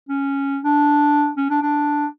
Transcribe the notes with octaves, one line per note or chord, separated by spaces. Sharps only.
C#4
D4
C#4
D4
D4